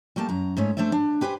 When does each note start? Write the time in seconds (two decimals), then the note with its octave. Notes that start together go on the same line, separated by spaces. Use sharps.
0.16 G3 A3 A#3 G5 A5
0.29 F#2 A#5
0.57 G#2 A3 C#4
0.77 A3 D4 C5 D5 E5
0.92 D4
1.21 G4 B4 C5 G5 G#5